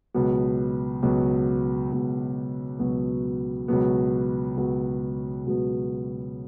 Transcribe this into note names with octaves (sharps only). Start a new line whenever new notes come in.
C#2 B2 F#3 B3
C#2 B2 F#3 B3
C#2 B2 F#3 B3
C#2 B2 F#3 B3
C#2 B2 F#3 B3
C#2 B2 F#3 B3
C#2 B2 F#3 B3